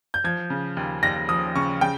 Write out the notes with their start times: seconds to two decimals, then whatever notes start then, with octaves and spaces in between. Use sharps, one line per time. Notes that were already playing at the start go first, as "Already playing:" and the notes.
0.14 G6
0.24 F3 G#6
0.50 C#3
0.77 D#2
1.03 D#2 A#6
1.29 F3 D#6
1.55 C#3 C#6
1.81 C#3 G5